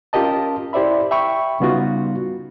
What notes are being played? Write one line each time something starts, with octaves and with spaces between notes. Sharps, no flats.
C#4 F4 G4 A#4 D#5 A5
E4 G4 C5 D5 E5 B5
E5 G5 B5 C#6
C#3 G3 B3 D#4 F4 F#4